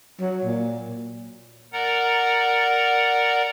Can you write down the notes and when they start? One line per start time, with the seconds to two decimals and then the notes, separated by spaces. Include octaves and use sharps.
0.20 F#3
0.45 A#2
1.73 A#4 D5 F#5 A#5